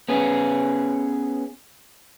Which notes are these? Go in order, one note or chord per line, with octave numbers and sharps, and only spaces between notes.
B3 C#4 G#4